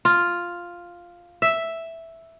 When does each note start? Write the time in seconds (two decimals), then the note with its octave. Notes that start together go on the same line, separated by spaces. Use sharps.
0.05 F4
1.42 E5